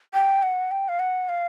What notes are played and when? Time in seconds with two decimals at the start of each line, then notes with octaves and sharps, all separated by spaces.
0.14 G5
0.43 F#5
0.71 G5
0.89 F5
0.99 F#5
1.29 F5